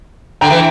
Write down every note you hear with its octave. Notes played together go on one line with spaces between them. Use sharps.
D3 G5 A#5
E3